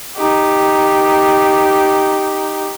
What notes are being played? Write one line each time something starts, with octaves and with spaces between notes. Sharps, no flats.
D#4 G4